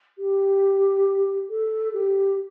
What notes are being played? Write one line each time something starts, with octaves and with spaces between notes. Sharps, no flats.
G4
A4
G4